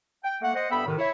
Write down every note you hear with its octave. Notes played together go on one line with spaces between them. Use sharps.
G5
A3 A#3 F#5
C5 D#5 F#5
G2 B3 A4 E5 G5 B5
A2 C3 D#3
E4 C#5